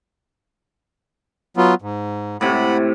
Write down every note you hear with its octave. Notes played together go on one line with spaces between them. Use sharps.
F#3 B3 F4
G#2
A2 C3 F#5 B5